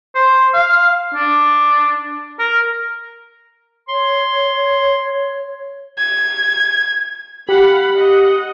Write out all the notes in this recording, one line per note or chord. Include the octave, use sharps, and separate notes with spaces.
C5
F5
D4
A#4
C#5 C6
G#6
G4 F5 F#5 B5
D#5 F#5